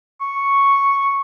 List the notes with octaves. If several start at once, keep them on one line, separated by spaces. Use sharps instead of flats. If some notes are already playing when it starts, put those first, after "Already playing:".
C#6